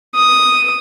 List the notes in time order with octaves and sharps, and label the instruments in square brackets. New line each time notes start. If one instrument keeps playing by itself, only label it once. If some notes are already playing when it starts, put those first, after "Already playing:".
[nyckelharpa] D#6